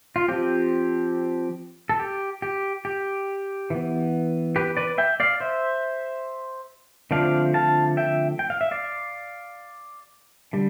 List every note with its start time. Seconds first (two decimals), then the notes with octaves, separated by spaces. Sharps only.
0.16 F4
0.28 F3 C4 G4
1.89 A4
1.99 G4
2.42 G4
2.85 G4
3.70 E3 B3
4.56 G4 B4
4.77 B4 D5
4.98 E5 G5
5.20 D5 F5
5.40 C5 E5
7.11 D3 F3 A3 C4 D5 F5
7.54 F5 A5
7.97 E5 G5
8.39 G5
8.50 F5
8.61 E5
8.71 D5 F5
10.53 D3 G3